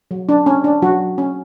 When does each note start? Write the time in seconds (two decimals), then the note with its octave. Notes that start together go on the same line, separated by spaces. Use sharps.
0.11 F#3
0.29 D4
0.46 C#4
0.64 D4
0.82 F#3 F#4
1.18 C#4